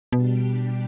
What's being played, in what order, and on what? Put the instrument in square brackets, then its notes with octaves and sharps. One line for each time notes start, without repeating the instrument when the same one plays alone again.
[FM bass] B2 [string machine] G3 D4 G4